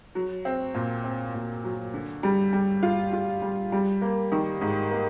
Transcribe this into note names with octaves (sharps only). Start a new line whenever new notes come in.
F#3
C4
A#2
C4
A#2
F#3
D3
G3
G3
F4
F4
G3
G3
A#3
D#3
G#2
A#3